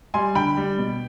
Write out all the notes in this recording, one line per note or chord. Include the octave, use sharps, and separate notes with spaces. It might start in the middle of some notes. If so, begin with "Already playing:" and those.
G3 G#5 C6
D3 G5 B5
G3
B2